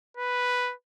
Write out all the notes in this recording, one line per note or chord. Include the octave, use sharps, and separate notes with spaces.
B4